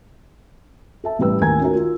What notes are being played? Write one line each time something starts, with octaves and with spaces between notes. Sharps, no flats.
A4 E5 A5
A1 A2 G3 B4 E6
D#2 A2 A#4 G#5 A#5 G#6
C#4 D#4 F4 F#4 A#4
F4